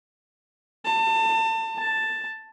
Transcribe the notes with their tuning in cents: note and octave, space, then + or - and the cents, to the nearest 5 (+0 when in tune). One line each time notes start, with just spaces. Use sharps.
A5 +30
A5 +5